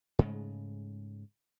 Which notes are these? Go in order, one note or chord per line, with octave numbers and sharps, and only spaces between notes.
G#2 C#3 G#3 A3